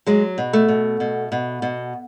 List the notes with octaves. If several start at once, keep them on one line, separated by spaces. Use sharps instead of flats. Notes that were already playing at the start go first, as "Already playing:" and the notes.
F#3 G#3
B2
A3
B2
B2
B2
B2